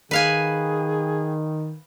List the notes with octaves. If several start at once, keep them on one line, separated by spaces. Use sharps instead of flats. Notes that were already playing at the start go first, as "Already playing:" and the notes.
D#3 G#4 B4 F5 G#5